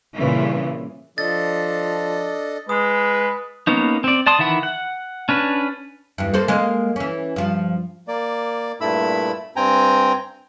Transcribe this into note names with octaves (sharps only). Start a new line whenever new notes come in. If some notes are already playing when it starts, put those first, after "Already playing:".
G2 A#2 C#3 E3
F3 D4 A4 D#5 A6
G#3 B4 D#6
A#3 B3 C#4 D#4
C4 D5
D5 A5 C6 D#6
D#3 E3 E5 F#5 B5
F#5
C#4 D4 B4
E2 G2
A#3 A4 C5
G#3 A#3 D#5
E3 C#4
G2 F3
A#3 D5
G2 A#2 A3 E4 B5 E6
G2 C4 G5 G#5 A#5